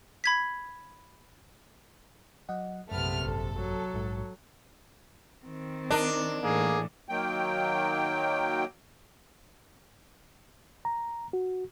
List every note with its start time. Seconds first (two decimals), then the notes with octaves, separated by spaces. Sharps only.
0.24 B5 G#6 B6
2.49 F#3 D#5 F#5
2.91 A#1 F#2 C3 A3 B3 F6
3.25 G#1 F#2 A4
3.57 F#3
3.94 A#1 G#2
5.46 D#3 C4
5.91 D4 D#4 A#4 D#5
6.42 A2 E3 A#3 G#4
7.09 D#3 F#3 A#3 G5
10.85 A#5
11.33 F#4